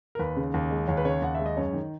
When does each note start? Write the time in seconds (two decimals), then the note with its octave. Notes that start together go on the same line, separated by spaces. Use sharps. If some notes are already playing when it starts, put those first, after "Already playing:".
0.15 A#4
0.19 D#2 B4
0.36 C#3
0.54 D#2
0.71 G#3
0.88 D#2 C#5
0.97 B4
1.05 C#3 C#5
1.22 D#2 F#5
1.35 G#3 E5
1.46 D#5
1.57 F#2 C#5
1.73 D#3